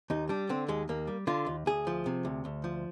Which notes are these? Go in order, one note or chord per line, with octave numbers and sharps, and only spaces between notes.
D#2 D#4
G3 D4
D3 C4
D#2 G#3
D#2 A#3
G3
D3 F4
D#2
D2 G#4
F3
C3
D2
D2
F3